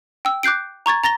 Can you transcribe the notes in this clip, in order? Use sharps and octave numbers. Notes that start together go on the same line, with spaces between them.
G5 E6
D6 F#6 G6 C7 D7
A#5 C#6 G#6 A6
A#5 A6 A#6 G7